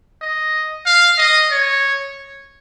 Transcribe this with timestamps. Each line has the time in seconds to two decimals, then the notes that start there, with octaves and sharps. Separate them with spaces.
0.21 D#5
0.86 F5
1.18 D#5
1.51 C#5